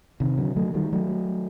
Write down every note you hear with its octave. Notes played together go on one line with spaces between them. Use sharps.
C3 D#3
D3 F#3
F#3 A3
D#3 G3
F#3 A3